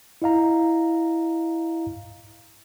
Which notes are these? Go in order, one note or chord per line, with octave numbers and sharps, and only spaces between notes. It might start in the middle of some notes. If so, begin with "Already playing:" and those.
E4 D#5 F5 A#5